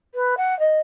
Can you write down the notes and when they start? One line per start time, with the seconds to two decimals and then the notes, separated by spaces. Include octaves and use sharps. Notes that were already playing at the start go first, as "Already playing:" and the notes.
0.15 B4
0.37 F#5
0.59 D#5